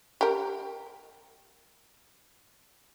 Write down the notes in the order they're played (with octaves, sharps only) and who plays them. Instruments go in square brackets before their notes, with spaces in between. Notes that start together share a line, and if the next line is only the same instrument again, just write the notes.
[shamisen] G4 A#4